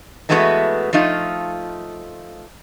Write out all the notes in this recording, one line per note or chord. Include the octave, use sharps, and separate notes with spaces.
E3 G#3 A3 B3 F4 F#4
F3 A3 D#4 F4